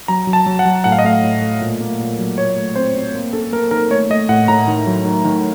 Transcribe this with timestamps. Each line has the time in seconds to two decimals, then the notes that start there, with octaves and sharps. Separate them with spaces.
0.08 F#3 A#5
0.27 F#3
0.33 A5
0.46 F#3
0.59 F#5
0.65 F#3
0.84 A2 F#5
0.92 F5
0.99 D#5
1.04 A3 F5
1.24 A2
1.42 A3
1.61 A#2
1.81 A#3
1.99 A#2
2.19 F#3
2.37 A#2 C#5
2.56 A3
2.76 C4 C5
2.95 C4
3.14 A#3
3.33 C#4 A4
3.52 A#3 A#4
3.71 D#3 A#4
3.90 A3 C#5
4.10 A3 D#5
4.29 A2 F#5
4.48 A2 A#5
4.68 D#3
4.86 F#3
5.06 D#3
5.25 D#3